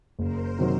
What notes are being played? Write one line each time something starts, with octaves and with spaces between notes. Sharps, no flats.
F#1 A#4 C5
C3 D#3 F#3